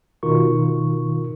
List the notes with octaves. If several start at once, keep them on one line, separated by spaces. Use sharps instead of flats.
B2 D#3 F4 A#4 C#6